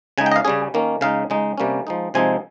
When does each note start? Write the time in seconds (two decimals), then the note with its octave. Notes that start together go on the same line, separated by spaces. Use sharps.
0.18 C#3 G#3 D#4 G#5
0.26 G5
0.32 D#5
0.36 F5
0.45 C#3 G3 C#4 G#4
0.74 D#3 A#3 C#4
1.01 C#3 G#3 D#4 F5
1.30 C#3 G#3 D#4
1.58 C3 G3 A#3 C#4
1.87 F3 G#3 D#4
2.14 C3 F3 G#3 C4 D#4 G#5